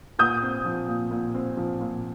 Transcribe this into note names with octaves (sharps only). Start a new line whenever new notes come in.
A#2 D#6 G6
C4
F3
A#2
A#2
C4
F3
A#2